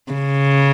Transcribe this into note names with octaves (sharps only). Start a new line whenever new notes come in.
C#3